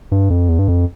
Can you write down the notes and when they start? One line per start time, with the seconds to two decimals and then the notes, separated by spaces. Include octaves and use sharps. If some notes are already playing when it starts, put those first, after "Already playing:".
0.12 G2
0.30 F2
0.49 E2
0.59 G2
0.68 F2